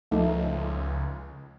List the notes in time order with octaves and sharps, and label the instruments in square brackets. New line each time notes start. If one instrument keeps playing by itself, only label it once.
[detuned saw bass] C#2 [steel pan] F3 A3 D#4